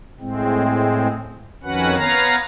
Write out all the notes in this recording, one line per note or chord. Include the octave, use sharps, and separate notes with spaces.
A2 G#3 C4
F2 D#3 C#4 F#4 B4 F#5
B3 B4 C#5 F5 A#5